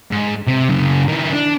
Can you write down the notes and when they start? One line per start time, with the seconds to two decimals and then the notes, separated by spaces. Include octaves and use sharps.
0.11 G#2
0.47 C3
0.69 F#2 C#3
1.08 D#3 E4
1.33 D4